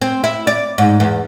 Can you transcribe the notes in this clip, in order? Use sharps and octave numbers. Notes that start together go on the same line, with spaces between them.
C4
E4
D5
G#2
E2